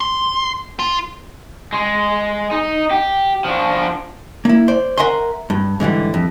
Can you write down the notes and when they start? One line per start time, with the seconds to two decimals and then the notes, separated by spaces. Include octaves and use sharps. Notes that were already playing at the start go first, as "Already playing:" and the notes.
0.01 C6
0.79 F4
1.73 G#3
2.51 D#4
2.91 G4
3.45 F3 D4
4.45 A#3 E4
4.68 C5 D5
4.98 A#4 E5 F#5 G#5 C6
5.50 G2
5.80 G#2 D3 E3 G3
6.14 F2